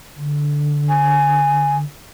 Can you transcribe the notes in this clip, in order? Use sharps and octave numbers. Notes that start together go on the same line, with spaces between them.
D3
G#5